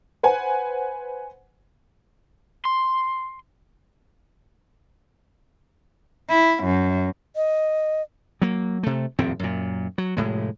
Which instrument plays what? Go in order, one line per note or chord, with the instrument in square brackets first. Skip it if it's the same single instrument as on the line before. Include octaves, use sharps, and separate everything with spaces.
[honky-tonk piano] B4 C5 F#5 G#5
[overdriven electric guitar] C6
[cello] E4
F#2
[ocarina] D#5
[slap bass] F#3 A#3
C3 A3
D#1 F2 A2 C4
F#2 A#2
F#3
F1 A2 G#3